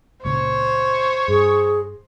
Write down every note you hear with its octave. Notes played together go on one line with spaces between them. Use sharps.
C#2 A#2 C#3 C5 C#5
G2 G#4